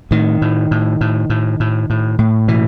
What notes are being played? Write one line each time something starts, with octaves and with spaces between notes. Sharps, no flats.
A2 D#3
A2
A2
A2
A2
A2
A2
A2
B2 E3